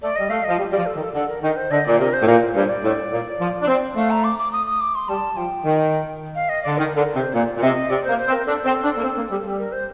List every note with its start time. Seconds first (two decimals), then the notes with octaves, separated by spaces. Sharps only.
0.02 A3 D5
0.16 G3 D#5
0.30 A3 F5
0.44 F3 D#5
0.58 G3
0.72 G3 D5
0.77 F3
0.86 A4
0.96 D#3
1.01 A4
1.14 D3 A4
1.29 A#4
1.43 D#3 A#4
1.56 C5
1.71 D3 D#5
1.85 A#2 D5
1.98 C3 A#4
2.13 C5
2.22 A2
2.27 A#2 A#4
2.55 G2 C5
2.69 D5
2.83 A2
3.12 A#2
3.40 F3
3.62 D4
3.68 C4
3.96 A3 F5
4.10 A#5
4.24 D6
4.39 D6
4.53 D#6
4.67 D#6
4.80 D6
4.95 C6
5.09 G3 A5
5.37 F3 G5
5.65 D#3
6.35 F5
6.49 D#5
6.63 D3 D5
6.78 D#3 A#4
6.96 D3 A#4
7.15 C3 C5
7.34 A#2 D5
7.57 A#2
7.62 C3 D#5
7.90 C3 D5
8.04 A#3 C5
8.18 C5
8.27 C4
8.32 A#4
8.46 D4 A4
8.65 C4
8.83 D4
8.98 A#3
9.03 C4
9.17 A#3
9.31 G3
9.45 G3
9.59 A#4
9.72 C5